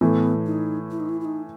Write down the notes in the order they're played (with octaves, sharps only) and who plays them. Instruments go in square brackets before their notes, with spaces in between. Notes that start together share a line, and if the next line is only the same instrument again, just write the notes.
[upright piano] A2 E3 A3 [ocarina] B3
[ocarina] D#4
E4
D#4
E4
E4
D#4